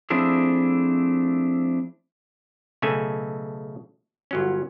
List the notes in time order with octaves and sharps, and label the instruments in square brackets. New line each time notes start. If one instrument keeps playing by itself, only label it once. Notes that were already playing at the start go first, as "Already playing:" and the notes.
[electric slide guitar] F3 A3 C4 D4 E4 G#4
[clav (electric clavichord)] B1 C#3 A3 A4 G#5
G1 F#3 C#4